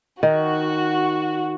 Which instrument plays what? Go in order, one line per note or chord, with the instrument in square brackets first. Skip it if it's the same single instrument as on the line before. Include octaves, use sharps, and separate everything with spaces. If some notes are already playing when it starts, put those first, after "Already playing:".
[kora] D#3 [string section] F#4